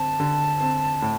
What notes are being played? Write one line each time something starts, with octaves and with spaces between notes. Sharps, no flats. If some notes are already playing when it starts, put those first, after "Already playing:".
Already playing: D3 C4 A5
D3
C4
A2